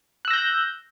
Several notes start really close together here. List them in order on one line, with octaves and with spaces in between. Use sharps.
F#6 E6 A#6 G6